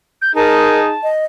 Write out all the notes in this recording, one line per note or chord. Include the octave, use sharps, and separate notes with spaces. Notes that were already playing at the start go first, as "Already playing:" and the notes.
G6
D#4 G#4 A#4 A5
D#5